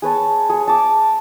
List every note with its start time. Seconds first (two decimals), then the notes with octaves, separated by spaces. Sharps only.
0.02 G#4 B4 C#5 A5
0.49 G#4 C#5
0.67 A5 D6